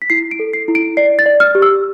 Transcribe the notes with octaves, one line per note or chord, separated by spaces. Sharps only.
B6
E4 C7
D7
A4
C7
E4
D7
D5 C7
A6
D5
F6
G4
E6